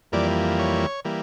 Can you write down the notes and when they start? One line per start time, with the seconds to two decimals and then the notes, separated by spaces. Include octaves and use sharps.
0.12 F2 E3 G3 A#3 D5
0.59 C#5
1.05 E3 G3 A#3